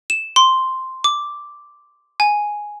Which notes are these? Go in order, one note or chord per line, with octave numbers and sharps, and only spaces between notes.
E7
C6
D6
G#5